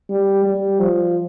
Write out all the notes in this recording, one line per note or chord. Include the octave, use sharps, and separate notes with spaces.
G3
G3
F3